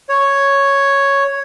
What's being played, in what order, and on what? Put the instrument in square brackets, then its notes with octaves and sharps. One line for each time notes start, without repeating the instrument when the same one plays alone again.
[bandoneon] C#5